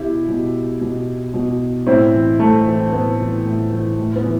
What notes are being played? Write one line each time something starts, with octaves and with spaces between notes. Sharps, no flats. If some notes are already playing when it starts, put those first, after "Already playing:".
Already playing: B2 E4 G4
B2
B2
B2
A2 C4 E4
E3
A2 A3
E3
A2 B3
E3
A2
E3
A2
B3
E3